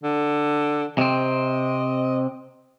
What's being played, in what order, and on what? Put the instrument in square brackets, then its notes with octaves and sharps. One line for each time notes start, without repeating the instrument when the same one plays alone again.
[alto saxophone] D3
[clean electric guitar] C3 C4 [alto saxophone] D#5